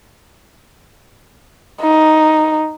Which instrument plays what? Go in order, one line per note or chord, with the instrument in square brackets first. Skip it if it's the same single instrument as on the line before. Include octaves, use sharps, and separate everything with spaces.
[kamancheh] D#4